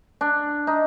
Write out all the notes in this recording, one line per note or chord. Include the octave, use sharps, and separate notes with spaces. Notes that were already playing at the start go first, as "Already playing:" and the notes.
D4
D#4